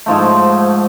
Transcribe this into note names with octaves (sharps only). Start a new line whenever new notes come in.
G#2 F3 A3